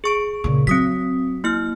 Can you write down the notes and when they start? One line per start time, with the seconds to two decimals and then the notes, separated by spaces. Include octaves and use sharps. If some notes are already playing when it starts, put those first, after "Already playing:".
0.04 G#4 C#6 D7
0.44 A#2 C#3
0.67 F#3 C4 D#6 B6
1.44 A#3 E4 F6